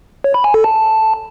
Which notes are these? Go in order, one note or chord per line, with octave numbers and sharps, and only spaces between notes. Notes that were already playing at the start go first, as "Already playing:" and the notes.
C#5
B5
G#5
A4
A5